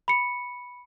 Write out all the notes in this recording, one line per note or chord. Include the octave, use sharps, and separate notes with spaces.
B5 C#7